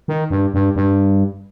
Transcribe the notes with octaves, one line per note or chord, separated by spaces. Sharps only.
D#3
G2
G2
G2